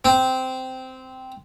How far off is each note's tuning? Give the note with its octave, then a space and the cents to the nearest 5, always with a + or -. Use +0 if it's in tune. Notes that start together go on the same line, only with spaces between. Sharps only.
C4 -10